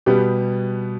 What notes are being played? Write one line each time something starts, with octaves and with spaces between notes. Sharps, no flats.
B2 G3 B3 G4